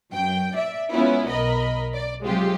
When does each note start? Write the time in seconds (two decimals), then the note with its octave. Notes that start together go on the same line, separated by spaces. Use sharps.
0.11 F#2 G5
0.55 D5 E5
0.92 G#3 B3 C#4 E4 F4
1.29 B1 A#4 D#5 B5
1.94 D5
2.25 C3 F#3 G#3 F4 G4